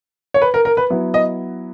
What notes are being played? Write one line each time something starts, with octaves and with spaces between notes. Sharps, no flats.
C#5
B4
A#4
A#4
B4
F#3 B3 E4
D#5